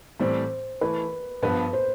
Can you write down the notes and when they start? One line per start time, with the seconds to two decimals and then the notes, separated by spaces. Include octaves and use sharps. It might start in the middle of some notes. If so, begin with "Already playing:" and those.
0.20 A2 E3 G3 C4 C5
0.81 E3 A3 E4 B4
1.42 G2 F3 B3 B4
1.73 C5